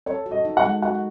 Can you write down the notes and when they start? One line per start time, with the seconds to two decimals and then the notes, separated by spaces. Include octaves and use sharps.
0.06 A4 C#5
0.26 F#4
0.31 D#5
0.45 D#4
0.57 F#5
0.64 G#3
0.82 F#4 F#5